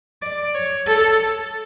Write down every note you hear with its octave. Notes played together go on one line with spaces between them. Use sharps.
D5
C#5
A4